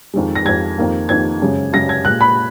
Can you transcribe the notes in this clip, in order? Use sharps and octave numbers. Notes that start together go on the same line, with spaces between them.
F2 D#3 G#3
A#6
F2 D#3 G#3 G#6
F2 D#3 A#3
F2 D#3 A#3 G#6
F#2 C#3 G#3
F#2 C#3 G#3 A#6
G#6
A#2 G#3 F#6
B5